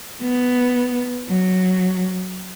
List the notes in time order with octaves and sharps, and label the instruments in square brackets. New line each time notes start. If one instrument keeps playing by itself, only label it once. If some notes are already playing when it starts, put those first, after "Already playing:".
[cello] B3
F#3